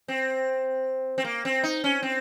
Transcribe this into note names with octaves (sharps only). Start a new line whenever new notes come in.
C4
C4
A#3
C4
D#4
C#4
C4